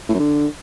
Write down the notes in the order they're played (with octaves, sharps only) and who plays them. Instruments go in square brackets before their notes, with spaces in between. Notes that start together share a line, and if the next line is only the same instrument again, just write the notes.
[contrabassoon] A2
F#2
D3